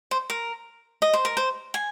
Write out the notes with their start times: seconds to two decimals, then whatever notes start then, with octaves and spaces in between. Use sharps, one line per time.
0.11 C5
0.30 A#4
1.02 D#5
1.13 C5
1.25 A#4
1.37 C5
1.74 G#5